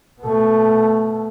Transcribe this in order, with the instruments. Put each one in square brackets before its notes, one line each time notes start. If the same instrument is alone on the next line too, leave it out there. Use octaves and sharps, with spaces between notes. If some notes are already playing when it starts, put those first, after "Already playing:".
[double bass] B2 A3